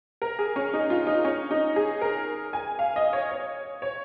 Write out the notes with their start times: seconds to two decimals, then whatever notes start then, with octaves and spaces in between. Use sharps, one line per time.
0.22 A#4
0.39 G#4
0.56 C#4
0.74 D#4
0.90 F4
1.07 D#4
1.24 C#4
1.51 D#4
1.76 G#4
2.01 A#4
2.53 G#5
2.79 F5
2.96 D#5
3.13 C#5
3.31 C#5
3.82 C#5